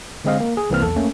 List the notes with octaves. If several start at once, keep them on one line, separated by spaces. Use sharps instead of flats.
D3 G#3 C4 D#5 F5
A#3
G#4
C2 E3 A#3 C4 F6
B1 E2 A4
A3 A#3 C#4